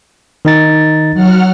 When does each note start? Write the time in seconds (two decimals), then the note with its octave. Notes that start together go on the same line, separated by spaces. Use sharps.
0.45 D#3 D#4 A6
1.14 F#3 F#5 F6